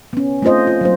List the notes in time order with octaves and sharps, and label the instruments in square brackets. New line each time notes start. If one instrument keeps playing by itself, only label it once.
[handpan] B3 C#4
A3 C4 F4 C5 D#5
F4
F#3 A#3 C5